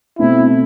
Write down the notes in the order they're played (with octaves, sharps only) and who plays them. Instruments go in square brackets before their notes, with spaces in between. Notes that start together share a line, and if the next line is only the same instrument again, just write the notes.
[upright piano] B2 A3 C4 [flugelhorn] E4